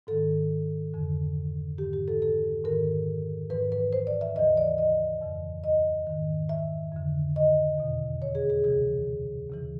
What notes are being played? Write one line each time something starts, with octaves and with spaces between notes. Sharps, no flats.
G#2 D#3 A4
F2 D3
G#2 E3 G4
G4
A4
A4
G#2 D#3 A#4
G#2 E3 B4
B4
C5
D5
E5
D#2 C#3 E3 D#5
D5
D#5
F2 C#3 E3
D#5
G#2 D#3
E5
F2 D3
D#5
E2 B2
C#5
G#4
G#4
D2 C3 E3 G#4
D#2 C#3 E3